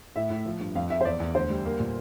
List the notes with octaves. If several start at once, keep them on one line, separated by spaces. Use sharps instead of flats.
A2 E5
A2
F3
G2
F2 F5
F2 E5
C5
E2 D5
E2
D2 C5
G3
A#3
A#2